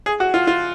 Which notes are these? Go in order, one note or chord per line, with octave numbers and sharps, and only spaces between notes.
G#4
F#4
F4
F4